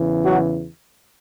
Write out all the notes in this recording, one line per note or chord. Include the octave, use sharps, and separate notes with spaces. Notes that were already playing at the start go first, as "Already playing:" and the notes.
Already playing: E2 C#3 E3
F#3 F#4